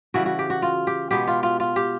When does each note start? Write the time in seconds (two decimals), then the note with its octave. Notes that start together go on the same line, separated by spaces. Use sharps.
0.14 C#3 E3 G3 F#4
0.26 F#4
0.39 G4
0.50 F#4
0.62 F4
0.87 G4
1.11 B2 G#3 B3 G4
1.28 F4
1.43 F4
1.60 F4
1.76 G4